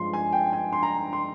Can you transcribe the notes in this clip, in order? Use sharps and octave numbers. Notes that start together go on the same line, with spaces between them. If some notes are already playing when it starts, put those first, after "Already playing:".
Already playing: G2 F3 G#3 C6
G#5
G5
G#5
C6
A#5
C6